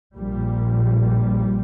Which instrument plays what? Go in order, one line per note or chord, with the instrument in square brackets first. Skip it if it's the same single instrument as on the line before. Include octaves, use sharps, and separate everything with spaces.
[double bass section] A#1 A#2 G3